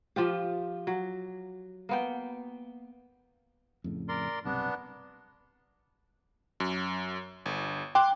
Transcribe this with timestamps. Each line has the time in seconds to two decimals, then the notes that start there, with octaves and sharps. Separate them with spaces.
0.16 F3 F4 G4
0.87 F#3
1.89 A#3 B3 G5
3.84 F2 A2 C#3
4.09 A#4 D5 C6
4.45 B1 G2 C3 B3 D4
6.60 F#2
7.46 G1
7.95 G5 C6 D6 F#6